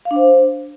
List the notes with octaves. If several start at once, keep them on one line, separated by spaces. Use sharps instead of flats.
F5
D4
C5